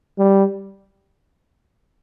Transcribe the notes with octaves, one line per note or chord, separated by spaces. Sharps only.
G3